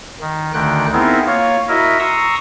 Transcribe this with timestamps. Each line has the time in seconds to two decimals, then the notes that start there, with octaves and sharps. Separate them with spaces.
0.21 D#3
0.54 D2 D3 D#3 G5 F#6
0.93 B3 C4 D#4 E4 G#4 A#4
1.26 A#3 F4 C#5 F5
1.68 E4 F#4 A#4 D#5 E5
1.99 A#5 C6 C#6 D#6 E6